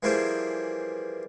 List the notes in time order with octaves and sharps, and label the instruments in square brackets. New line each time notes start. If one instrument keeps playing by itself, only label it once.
[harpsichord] E3 F3 G3 A#3 G#4 C5